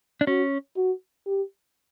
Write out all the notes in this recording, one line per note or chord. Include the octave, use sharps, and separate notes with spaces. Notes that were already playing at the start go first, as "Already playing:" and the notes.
D4
C#4 F#4
F#4
G4